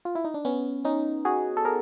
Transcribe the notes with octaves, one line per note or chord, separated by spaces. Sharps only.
F4
E4
D#4
D4
B3 C#4
C#4 D#4
F#4 G#4
A4
G#4 A#4